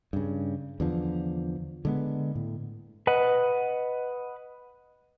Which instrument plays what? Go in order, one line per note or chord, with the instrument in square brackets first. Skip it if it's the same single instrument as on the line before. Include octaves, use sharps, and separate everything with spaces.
[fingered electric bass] G2 C#3
E2 D3 F3
D3 G#3 B3
A2
[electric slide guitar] B4 D#5 F#5